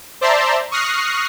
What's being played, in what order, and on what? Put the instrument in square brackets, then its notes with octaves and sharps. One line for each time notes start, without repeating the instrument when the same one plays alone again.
[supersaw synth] C5 D5 E5 A5 A#5 C6
C#6 D#6 F6 F#6 A#6 C7